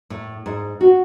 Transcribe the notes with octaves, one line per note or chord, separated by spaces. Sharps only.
A2
G#2
F#4